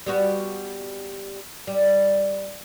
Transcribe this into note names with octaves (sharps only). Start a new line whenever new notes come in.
G3 B3 F#4
G3